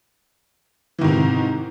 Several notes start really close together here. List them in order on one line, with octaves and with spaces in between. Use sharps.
E3 D#3 G#2 C3